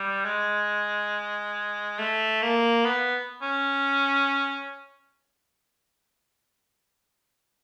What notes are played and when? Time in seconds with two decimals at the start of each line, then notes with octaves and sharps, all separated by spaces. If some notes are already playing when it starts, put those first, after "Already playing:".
Already playing: G3
0.25 G#3
1.99 A3
2.42 A#3
2.85 B3
3.42 C#4